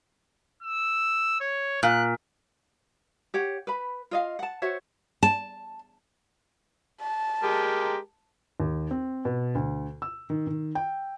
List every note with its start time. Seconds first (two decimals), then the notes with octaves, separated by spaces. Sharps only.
0.63 E6
1.41 C#5
1.83 A#2 F#6
3.34 G4 C#5 F#5
3.67 B4 B5
4.11 F4 D#5 F5
4.39 F#5 A5
4.62 F#4 C5 C#5 E5
5.23 A5
7.02 A5
7.43 G#3 G4 A#4
8.60 D#2
8.91 C4
9.25 B2
9.55 D2
10.02 E6
10.30 D#3
10.47 D#3
10.75 G5